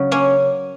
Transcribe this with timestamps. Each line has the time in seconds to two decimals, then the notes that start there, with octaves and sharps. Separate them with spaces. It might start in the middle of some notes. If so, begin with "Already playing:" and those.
Already playing: C#3 F#3
0.11 A#3 C#4